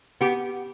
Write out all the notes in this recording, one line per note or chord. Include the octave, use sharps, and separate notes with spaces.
B3 G4